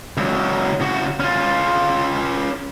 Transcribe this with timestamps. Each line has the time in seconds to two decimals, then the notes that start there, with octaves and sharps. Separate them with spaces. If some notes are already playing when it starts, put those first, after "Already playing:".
0.17 C#2 F#3
0.80 C#3 F#4
1.20 C#4 F4